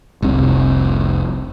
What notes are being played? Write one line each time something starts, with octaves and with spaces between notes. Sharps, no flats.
F1 C2 C3